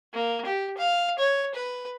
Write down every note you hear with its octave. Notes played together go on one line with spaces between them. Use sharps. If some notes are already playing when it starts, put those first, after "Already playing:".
A#3
G4
F5
C#5
B4